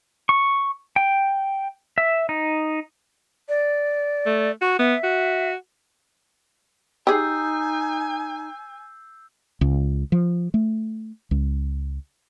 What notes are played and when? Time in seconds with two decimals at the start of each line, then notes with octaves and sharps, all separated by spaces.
0.29 C#6
0.96 G5
1.98 E5
2.29 D#4
3.49 D5
4.26 A3
4.61 F#4 C#6
4.79 B3 E5
5.03 F#4
7.07 D#4 G4 G#4 G#5 E6 G6 C7
9.61 C#2
10.12 F3
10.54 A3
11.31 C#2